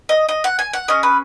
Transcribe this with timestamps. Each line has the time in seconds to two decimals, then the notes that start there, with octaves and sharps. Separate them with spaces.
0.09 D#5
0.29 D#5
0.44 F#5
0.59 G#5
0.73 F#5
0.88 C#4 G#4 D#5
1.03 B4